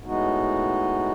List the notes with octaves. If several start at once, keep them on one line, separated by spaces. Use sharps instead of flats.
A2 G#3 B3 D#4 F#4